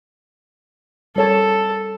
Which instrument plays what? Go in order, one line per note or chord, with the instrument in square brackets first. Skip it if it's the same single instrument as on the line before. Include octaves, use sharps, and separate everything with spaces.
[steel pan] G3 C#5 A5 [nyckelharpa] A4